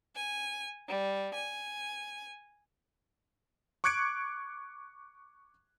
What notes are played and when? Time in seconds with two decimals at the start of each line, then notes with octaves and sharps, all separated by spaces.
0.15 G#5
0.87 G3
1.34 G#5
3.84 C#6 D6 F#6 G#6 C#7 D7